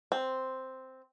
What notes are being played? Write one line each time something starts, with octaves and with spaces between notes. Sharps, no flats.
C4